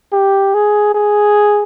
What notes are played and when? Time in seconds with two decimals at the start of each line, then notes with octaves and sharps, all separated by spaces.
0.12 G4
0.54 G#4
0.95 G#4